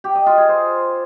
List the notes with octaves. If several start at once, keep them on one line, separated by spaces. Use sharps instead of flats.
G4
D#5
F4
G#4
C5